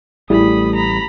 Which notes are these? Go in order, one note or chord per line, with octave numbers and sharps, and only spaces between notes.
A1 G3 A3 E4 G#4 B5 D#6
A#5 B5